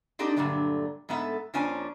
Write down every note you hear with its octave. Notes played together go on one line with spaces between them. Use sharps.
C4 D4 D#4 F#4 G4 A4
G2 A#2 D3 F#3 A3
G#2 A3 B3 A4 E5
F2 F3 A#3 C#4 D4 G#5